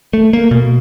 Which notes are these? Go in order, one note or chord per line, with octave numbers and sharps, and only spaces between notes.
A3
A#3
B2